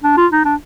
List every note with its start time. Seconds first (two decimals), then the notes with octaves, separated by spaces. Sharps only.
0.04 D4
0.17 F4
0.32 D#4
0.45 D4